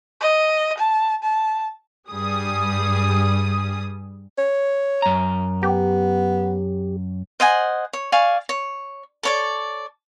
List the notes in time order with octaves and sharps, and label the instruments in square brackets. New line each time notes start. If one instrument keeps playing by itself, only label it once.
[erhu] D#5
A5
A5
[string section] G2 G3 G#4 D#6
[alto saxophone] C#5
[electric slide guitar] F#2 A#5
[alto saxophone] B3 [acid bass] G4
[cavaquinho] C5 D#5 F#5 G#5
C#5
D5 F5 G#5 C#6
C#5
A4 C#5 D5